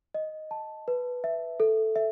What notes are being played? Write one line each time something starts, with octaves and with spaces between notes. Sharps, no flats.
D#5
A5
B4
E5
A4
E5